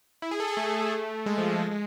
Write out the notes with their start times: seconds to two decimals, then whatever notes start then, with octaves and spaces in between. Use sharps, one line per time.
0.22 E4
0.31 G#4
0.40 A4
0.48 G#4
0.57 A3
1.26 G#3
1.38 F3
1.49 F3
1.61 G#3
1.71 G#3